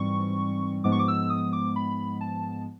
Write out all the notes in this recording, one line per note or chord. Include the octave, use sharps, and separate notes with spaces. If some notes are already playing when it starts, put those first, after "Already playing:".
Already playing: G#2 E3 G3 C4 C#6
G#2 F3 G#3 B3 D6
C#6
D6
E6
D#6
D6
B5
A5